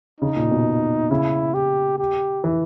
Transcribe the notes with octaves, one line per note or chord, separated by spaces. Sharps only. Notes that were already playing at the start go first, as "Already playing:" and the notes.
C#3 D#4
A#2
B2
C#3 E4
G4
G4
E3